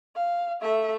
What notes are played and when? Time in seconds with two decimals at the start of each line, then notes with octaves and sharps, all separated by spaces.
0.15 F5
0.62 A3 E5